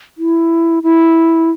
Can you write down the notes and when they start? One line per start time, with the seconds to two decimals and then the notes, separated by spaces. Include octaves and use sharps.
0.18 E4
0.83 E4